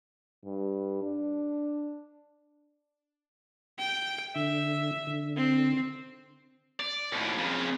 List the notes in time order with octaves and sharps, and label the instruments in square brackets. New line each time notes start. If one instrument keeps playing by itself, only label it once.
[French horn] G2
D4
[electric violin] G5
[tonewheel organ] D3 [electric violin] E5
[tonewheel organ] D3
[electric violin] C4
[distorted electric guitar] D5
D#2 A2
F2 C#3